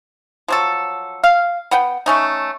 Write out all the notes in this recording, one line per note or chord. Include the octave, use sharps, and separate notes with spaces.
F3 F#3 A4
F5
B3 F#5 G5
A3 C#4 D#4